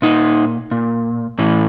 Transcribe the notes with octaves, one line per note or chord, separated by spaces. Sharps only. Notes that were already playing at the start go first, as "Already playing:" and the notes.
A#2 D#4
A#2
A2 E3